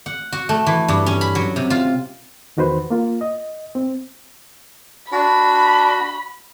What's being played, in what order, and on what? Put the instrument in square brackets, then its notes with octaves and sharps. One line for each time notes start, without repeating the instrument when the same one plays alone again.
[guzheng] F#5
F#4
A3
E3
G2
C#4
B5
F#3
C3
F4
[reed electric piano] E2 D#3 F#4 B4 C5
A#3 F4
D#5
C4
[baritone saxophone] D4 [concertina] F#4 [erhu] B5